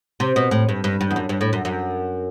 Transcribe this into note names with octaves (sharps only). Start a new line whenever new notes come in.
C3
B2
A2
G2
G2
G2
E2
F#2
G2
A2
F#2
F#2